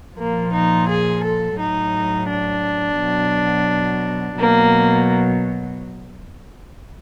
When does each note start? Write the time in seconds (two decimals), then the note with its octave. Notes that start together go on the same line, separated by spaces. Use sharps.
0.17 A#2 F3 A#3
0.52 D#4
0.88 G#4
1.23 A4
1.58 A2 F#3 D#4
2.28 D4
2.99 B2 F#3
4.39 B2 F#3 A#3